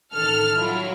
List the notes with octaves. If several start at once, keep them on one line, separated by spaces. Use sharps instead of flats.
A1 D#3 A4 F6
F#3 E4 F4